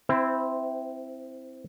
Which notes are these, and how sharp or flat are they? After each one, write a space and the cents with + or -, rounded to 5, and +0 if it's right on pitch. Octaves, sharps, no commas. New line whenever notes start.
C4 -5 E4 +0 C5 -30